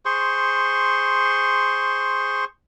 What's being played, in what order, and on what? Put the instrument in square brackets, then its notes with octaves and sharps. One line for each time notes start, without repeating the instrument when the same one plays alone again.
[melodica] G#4 C5 C6 C#6